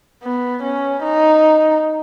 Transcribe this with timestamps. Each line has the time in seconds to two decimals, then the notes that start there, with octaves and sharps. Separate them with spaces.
0.23 B3
0.63 C#4
1.04 D#4